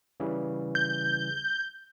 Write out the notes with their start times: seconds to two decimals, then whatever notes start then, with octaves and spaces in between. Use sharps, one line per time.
0.20 C#3 E3 G3
0.75 G6